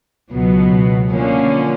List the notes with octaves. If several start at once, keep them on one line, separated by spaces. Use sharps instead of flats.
C#2 B2 F#3 B3
D3 F3 A#3 C#4